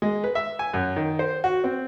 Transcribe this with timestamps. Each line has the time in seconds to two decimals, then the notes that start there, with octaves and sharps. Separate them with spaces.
0.02 G#3
0.24 B4
0.35 E5
0.59 G#5
0.74 F#2
0.96 D#3
1.19 C5
1.44 F#4
1.64 C4